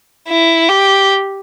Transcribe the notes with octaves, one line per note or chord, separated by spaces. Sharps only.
E4
G4